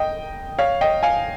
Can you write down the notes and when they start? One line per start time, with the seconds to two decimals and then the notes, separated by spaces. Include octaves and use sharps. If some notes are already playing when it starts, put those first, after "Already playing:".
Already playing: D#5 G5
0.58 C#5 F5
0.81 D#5 G5
1.03 F5 G#5